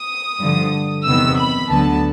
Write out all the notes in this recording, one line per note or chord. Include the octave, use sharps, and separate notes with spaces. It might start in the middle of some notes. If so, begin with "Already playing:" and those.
Already playing: D#6
G2 D3 F3
E2 C3 D#3 F#3 B3 E6
B5
D2 D3 F#3 B3 A5